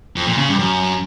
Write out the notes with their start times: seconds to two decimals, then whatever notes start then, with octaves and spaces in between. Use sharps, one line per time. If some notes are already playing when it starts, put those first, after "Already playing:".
0.16 F2
0.27 A#2
0.38 C#3
0.48 G2
0.59 F#2